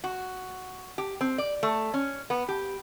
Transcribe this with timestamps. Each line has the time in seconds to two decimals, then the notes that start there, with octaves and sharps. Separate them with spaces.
0.04 F#4
0.98 G4
1.21 C4
1.38 D5
1.63 A3
1.94 C#4
2.30 B3
2.49 G4